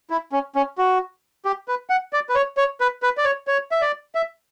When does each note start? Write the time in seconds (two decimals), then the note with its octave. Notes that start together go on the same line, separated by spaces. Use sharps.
0.10 E4
0.32 C#4
0.55 C#4
0.78 F#4
1.45 G4
1.68 B4
1.90 F#5
2.13 D5
2.29 B4
2.35 C#5
2.57 C#5
2.81 B4
3.03 B4
3.17 D5
3.25 C#5
3.47 C#5
3.72 E5
3.81 D5
4.15 E5